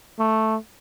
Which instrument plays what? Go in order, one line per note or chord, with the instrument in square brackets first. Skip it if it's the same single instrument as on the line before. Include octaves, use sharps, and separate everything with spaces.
[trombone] A3